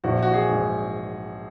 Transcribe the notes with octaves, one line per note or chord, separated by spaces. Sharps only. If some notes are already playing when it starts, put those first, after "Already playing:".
A#1 F#4
F#4
G#4
G#2 G#3